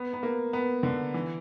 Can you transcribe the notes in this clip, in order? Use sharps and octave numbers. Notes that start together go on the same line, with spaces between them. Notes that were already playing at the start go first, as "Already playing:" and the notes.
Already playing: B3
B3
A#3
B3
D3
E3